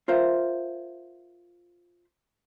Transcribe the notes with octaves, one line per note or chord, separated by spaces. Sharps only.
F4 A#4 C5 E5